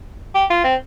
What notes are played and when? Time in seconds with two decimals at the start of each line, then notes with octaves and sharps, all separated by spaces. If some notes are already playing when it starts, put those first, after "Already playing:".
0.35 G4
0.50 F4
0.64 C4